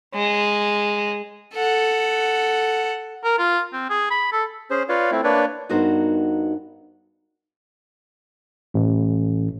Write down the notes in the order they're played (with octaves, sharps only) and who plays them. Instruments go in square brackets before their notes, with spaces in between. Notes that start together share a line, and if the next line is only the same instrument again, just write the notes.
[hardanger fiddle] G#3
A4 F#5
[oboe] A#4
F4
C4
G#4
B5
A4
[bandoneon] C#4 G#4 C5
F4 B4 C#5 D5 F5
A3 C4 E4
A#3 D4 B4 C#5 D5
[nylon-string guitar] G2 B3 D#4 F#4 A#4 C5
[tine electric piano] A1